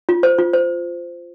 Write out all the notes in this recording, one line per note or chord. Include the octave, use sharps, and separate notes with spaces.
F4
C5
F4
C5